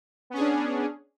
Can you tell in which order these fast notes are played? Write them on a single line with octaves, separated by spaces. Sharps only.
B3 C#4 G#4 D4